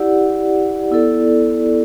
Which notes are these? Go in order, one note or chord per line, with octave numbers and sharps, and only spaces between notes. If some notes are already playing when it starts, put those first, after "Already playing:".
Already playing: E4 G4 D5 F#5
B3 E4 A4 D5